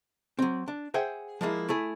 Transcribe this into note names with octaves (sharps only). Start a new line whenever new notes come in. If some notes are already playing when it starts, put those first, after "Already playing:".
F#3 C4
D4
G#4 C5 E5 F#5 G5
F3 G#3 A#3 E4
A3 E4 G#4